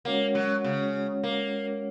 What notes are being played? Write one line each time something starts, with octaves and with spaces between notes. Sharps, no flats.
G#3 A#3 C#4 F#4 C#5 F#5
F#3
C#3
A#3